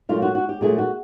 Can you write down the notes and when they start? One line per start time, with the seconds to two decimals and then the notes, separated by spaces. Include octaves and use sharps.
0.09 A#2 F#3 A3 F4
0.22 F#4
0.35 F#4
0.49 G4
0.61 A#2 F#3 A3 G#4
0.78 F#4